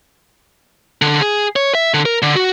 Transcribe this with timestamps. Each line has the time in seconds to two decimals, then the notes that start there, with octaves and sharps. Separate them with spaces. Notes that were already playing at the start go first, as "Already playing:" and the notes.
1.02 D3
1.21 G#4
1.56 C#5
1.75 E5
1.94 D3
2.05 A#4
2.22 D3
2.36 F#4